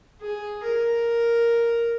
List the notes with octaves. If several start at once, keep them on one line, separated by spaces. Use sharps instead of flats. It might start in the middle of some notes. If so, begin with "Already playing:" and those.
G#4
A#4